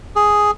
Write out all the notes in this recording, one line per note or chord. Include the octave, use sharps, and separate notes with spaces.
G#4